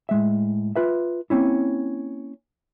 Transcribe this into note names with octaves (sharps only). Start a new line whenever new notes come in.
A2 G#3 E5
F4 B4 E5
A#3 C4 C#4 E4